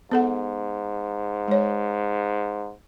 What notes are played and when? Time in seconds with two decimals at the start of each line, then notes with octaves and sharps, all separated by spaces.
0.12 G#2 B3 A4 F#5
1.48 G#3 C#5